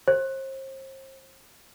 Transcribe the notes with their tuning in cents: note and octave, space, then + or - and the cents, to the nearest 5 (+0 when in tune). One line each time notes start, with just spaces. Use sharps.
C5 +35